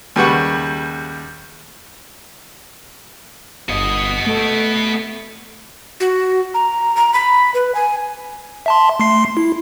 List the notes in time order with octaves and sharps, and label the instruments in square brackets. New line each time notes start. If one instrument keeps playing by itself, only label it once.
[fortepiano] D#2 C#3 G3 B4 F#5 C#6
[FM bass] G1 [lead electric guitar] B3 D#5
[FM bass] A3
[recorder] F#4
A#5
A#5
B5
B4
G#5
[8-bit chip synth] E5 A5 C6
A3 C6 C7
E4